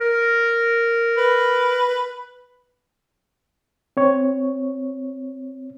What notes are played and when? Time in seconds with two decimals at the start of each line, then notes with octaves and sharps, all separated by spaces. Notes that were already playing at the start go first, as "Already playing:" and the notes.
0.01 A#4
1.17 B4
3.97 C4 C#5